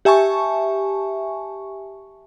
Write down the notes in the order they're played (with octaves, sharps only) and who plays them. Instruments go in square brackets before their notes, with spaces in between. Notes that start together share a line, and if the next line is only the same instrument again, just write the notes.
[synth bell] G4 E5 G#5 A5 C#6